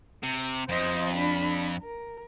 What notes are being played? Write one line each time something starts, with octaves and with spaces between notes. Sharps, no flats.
C3
F2 C5 D#5
D4 B5
A#4